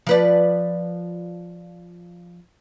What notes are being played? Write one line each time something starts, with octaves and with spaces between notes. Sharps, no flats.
F3 B4 D5